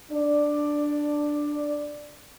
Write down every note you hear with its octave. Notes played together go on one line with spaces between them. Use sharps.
D4 D5